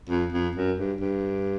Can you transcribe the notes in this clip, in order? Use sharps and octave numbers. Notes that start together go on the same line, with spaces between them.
F2
F2
F#2
G2
G2